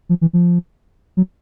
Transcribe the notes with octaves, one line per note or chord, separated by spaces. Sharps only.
F3
E3
F3
F#3